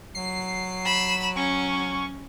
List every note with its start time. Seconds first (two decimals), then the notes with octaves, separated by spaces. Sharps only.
0.15 F#3 C7
0.85 B5 E7
1.36 C#4 C#6